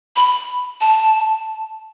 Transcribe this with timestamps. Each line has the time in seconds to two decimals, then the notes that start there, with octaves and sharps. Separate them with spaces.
0.16 B5
0.81 A5